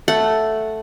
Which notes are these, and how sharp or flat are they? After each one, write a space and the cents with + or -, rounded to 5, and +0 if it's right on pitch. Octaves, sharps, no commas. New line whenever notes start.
A3 +0 F#5 +0